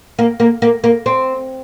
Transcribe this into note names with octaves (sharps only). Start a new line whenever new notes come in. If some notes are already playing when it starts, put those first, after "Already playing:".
A#3
A#3
A#3
A#3
C4